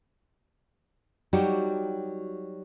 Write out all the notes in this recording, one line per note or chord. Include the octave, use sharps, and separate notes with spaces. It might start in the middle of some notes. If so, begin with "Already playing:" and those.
F#3 G3 D#4 F#4 G4